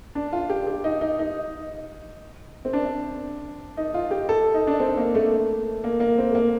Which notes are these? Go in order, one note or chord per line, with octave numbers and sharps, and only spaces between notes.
D4
F4
G4
G4
D#4
D#4
D#4
C4
D4
D#4
F4
G4
A4
D#4
D4
C4
A#3
A3
A#3
A#3
C4
A3
A#3